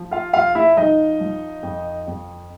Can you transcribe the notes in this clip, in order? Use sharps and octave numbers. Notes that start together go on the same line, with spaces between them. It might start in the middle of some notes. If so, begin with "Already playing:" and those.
Already playing: F3
F4 F5
F2 F4 F5
E4 E5
F3 D#4 D#5
F3
F2
F2